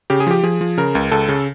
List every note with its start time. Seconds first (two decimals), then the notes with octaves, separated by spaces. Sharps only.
0.10 C#3 G4
0.20 G#4
0.27 F3 G4
0.43 F3 G#4
0.61 F3
0.77 C#3 A#4
0.95 C#2
1.12 C#2 A4
1.29 C#3